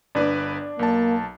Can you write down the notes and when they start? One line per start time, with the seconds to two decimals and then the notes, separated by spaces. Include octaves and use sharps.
0.15 G1 D4 B4 D5
0.79 B1 A#3 A5